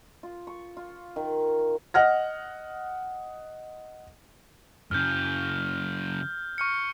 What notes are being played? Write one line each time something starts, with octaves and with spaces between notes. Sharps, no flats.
F4
C#6
F4
D#3
D#5 F#5 F6 A#6
F#2 C#3 F6 G6
C#6 F6 C#7